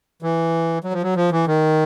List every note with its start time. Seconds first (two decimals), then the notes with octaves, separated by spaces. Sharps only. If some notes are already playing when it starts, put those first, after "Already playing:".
0.23 E3
0.84 F#3
0.93 F3
1.03 F#3
1.16 F3
1.31 E3
1.47 D#3